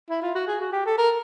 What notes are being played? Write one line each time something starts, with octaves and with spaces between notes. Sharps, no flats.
E4
F4
F#4
G#4
F#4
G4
A4
A#4